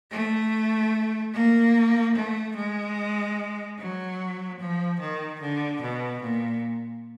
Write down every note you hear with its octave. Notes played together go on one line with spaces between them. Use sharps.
A3
A#3
A3
G#3
F#3
F3
D#3
D3
B2
A#2